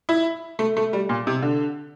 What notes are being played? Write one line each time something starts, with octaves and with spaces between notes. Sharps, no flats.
E4
A3
A3
G3
A#2
C3
D3